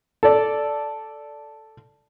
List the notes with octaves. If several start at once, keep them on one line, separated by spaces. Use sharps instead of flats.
A4 D5